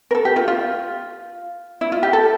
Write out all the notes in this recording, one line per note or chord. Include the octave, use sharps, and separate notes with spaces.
A#4
A4
G4
F4
F4
E4
F4
G4
A4